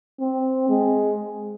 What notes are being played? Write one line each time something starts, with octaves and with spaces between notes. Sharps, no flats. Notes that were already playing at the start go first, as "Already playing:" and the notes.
C4
G#3